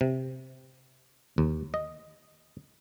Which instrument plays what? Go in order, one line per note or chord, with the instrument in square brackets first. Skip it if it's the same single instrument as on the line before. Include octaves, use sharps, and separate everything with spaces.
[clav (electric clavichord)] C3
D#2
D#5